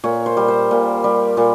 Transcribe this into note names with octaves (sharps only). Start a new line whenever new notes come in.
A#2 C#5
C5
G3
C5
A#2
G3
A#2